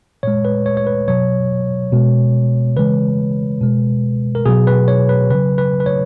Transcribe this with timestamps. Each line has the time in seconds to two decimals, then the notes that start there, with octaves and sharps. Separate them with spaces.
0.23 A#2 G#3 C#5
0.45 B4
0.66 C#5
0.77 C#5
0.87 B4
1.08 B2 F#3 C#5
1.92 B2 G#3
2.77 C#3 E3 G#3 B4
3.61 B2 G#3
4.35 A#4
4.46 B2 F#3 G#4
4.67 B4
4.88 C#5
5.09 B4
5.30 C#3 F#3 B4
5.58 B4
5.80 B4
5.86 C#5